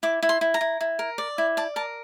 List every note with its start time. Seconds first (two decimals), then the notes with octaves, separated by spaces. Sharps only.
0.03 E4 D6
0.23 E4
0.29 C6
0.41 E4
0.54 A#5
0.61 E4
0.81 E4
0.99 A#4
1.18 D5
1.38 E4
1.57 D5 A5
1.76 A#4 A5